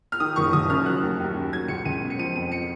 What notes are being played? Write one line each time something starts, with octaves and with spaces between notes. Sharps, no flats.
F6
D#3 D#6
F#1 C#6
F#1 D#6
F#2 F6
F#3 F#6
D#2
D#2
C#3
F#3 G#6
C#2 C#7
C#2 D#7
B2
C#7
F3 D#7
F2 D#7
C#7